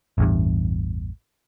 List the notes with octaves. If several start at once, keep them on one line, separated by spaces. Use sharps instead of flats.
A1 E2 G2